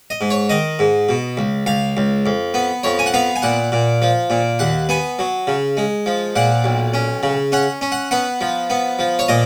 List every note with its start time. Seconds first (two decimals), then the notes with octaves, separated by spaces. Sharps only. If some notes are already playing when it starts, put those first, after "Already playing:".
0.10 D#5
0.21 G#2
0.30 C#5
0.49 D#3 D#5
0.79 G#2
1.09 B2
1.37 C#2
1.66 C#2 F5
1.97 C#2
2.26 F2
2.54 B3
2.83 F2 C#5
2.99 G#5
3.06 F#5
3.14 B3 F5
3.36 G#5
3.42 A#2 F#5
3.72 A#2
4.02 F3
4.30 A#2
4.59 D#2 F#5
4.89 B3 G#5
5.19 F#3
5.47 C#3
5.77 G#3
6.06 F3
6.36 A#2 F#5
6.64 B1
6.94 C#4
7.23 C#3
7.52 C#4 F#5
7.81 C#4
7.92 F#5
8.11 B3 F#5
8.41 F3
8.70 B3
8.99 F3
9.19 C#5
9.28 A#2 D#5